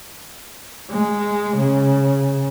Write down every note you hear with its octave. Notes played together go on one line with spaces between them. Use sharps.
G#3
C#3